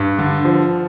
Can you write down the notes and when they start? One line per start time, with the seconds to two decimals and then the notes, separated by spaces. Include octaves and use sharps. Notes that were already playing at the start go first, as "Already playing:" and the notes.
Already playing: G2
0.19 D3
0.45 F3